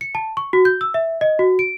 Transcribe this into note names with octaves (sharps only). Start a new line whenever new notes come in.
C#7
A5
C#6
F#4
G6
E6
E5
D#5
F#4
D7